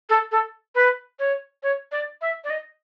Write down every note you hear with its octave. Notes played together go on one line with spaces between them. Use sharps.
A4
A4
B4
C#5
C#5
D5
E5
D5
D#5